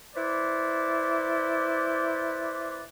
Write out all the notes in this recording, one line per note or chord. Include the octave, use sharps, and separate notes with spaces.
E4 B4 C5 D5